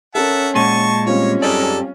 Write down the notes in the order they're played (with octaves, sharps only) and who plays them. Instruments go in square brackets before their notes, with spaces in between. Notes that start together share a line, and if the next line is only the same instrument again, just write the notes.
[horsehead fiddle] C#4 [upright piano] A4 A#4 [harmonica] E5 F#5 A5
[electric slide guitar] A#2 G#3 [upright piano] F#5 D#7 [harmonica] A5 C#6
[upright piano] G3 C4 F4 [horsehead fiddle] C#4 [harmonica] C#5
[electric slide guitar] F#2 G4 D5 [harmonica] G#3 D#4 A4